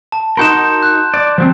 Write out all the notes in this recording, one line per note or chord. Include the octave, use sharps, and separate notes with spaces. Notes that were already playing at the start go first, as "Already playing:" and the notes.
A5
D#4 F#4 A#4 C6 G6 E7
F#6
D5
F3 F#3 C4